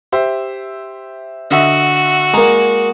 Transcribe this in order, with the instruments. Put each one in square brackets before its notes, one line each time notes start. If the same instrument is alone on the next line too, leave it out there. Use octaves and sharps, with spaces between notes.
[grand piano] G4 C5 E5
[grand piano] D3 E5 [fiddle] F#4 [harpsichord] D#5
[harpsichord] G#3 A#3 [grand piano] A#5